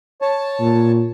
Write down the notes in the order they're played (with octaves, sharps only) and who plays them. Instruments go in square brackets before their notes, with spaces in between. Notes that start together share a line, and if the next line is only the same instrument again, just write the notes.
[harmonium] C#5 A5
[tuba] A#2